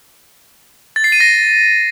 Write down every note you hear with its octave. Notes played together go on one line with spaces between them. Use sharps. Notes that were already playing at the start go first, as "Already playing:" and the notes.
A6
C7
D#7
A#6